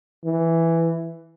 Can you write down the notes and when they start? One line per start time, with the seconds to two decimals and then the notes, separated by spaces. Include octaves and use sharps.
0.24 E3